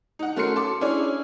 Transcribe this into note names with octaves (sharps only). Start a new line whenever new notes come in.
D#4 F#5
A3 C#4 F#4 A#4 C6 C#7
A4 A5 C6 D6
C#4 D4 E4 G#4 C#5 D5